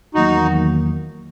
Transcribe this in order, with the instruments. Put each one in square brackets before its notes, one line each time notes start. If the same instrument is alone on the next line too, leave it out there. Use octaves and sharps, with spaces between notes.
[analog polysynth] E2 D#3 F#3 A#3 [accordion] D#4 F#4